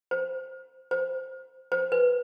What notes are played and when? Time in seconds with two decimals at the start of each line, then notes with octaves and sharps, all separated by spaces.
0.11 C5
0.91 C5
1.72 C5
1.92 B4